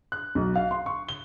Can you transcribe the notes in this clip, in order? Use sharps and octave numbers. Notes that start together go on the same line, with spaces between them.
F#6
B1
F5
C6
C#6
G7